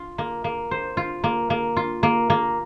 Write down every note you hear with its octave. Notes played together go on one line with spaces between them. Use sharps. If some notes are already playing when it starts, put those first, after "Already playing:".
Already playing: F4
A#3
A#3
C5
F4
A#3
A#3
F4
A#3
A#3